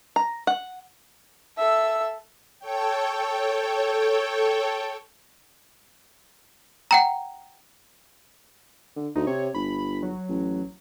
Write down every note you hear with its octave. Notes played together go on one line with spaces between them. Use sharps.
A#5
F#5
A4 E5
A4 C#5 G5
F#5 G5 A#5
D3
D2 D#4
C3 C#5
G1 B5
F#3
A1